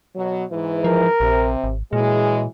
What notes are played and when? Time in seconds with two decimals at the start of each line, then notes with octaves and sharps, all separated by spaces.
0.16 B2 F#3
0.51 G#2 E3
0.84 F3 A#4
1.20 A#1 C3
1.64 G#1
1.93 A#2 E3 F#3 G#3 G#4